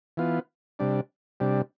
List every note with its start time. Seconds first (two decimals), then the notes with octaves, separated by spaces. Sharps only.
0.17 E3 B3 F4
0.79 C3 G3 D4
1.40 C3 G3 D4